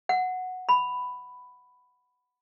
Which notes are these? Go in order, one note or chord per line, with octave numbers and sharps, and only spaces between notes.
F#5
B5